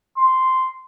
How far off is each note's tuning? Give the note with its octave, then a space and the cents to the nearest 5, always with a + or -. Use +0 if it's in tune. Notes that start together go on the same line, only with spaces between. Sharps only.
C6 -5